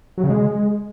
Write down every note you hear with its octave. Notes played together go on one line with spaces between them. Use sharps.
F#3
C#3
G#3